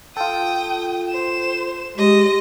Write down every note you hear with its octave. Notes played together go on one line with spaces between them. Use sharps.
F4 A4 G5 D#6
C5 E7
G#3 G4 D#5